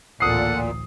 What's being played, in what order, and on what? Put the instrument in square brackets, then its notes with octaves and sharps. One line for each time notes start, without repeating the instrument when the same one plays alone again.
[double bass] A1 D2 [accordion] A#2 [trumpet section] A4 D5 F#5 [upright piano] D#6 C7